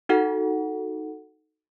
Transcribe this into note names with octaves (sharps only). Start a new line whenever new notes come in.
D#4 F#4 A4 F#5